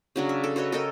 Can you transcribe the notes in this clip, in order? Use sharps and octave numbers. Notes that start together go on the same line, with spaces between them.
C#3 F#3 D4
E5
A4
F#4 B4 C#5 D#5
A4 A#4 D#5 G5